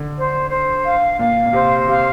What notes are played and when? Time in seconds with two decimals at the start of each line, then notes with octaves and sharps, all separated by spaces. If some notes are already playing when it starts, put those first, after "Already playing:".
Already playing: D3
0.16 C5
0.50 C5
0.84 F5
1.19 A#2 F5
1.46 A#2
1.53 C3 C5
1.87 C3 F5